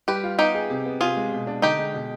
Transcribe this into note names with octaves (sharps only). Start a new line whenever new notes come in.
G3 G4 B4
F4
B3 D#4 G4
G#4
C3
B3
C3 F4 G#4
G#3
B2
D4
D3 D#4 G4
G#3
B2